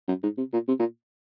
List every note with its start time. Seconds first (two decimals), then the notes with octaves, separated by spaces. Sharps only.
0.08 F#2
0.23 G#2
0.38 C3
0.53 A#2
0.68 C3
0.80 A#2